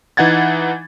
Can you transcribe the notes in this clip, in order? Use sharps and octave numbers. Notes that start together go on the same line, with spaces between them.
E3 D#4 F#5 G#6 A6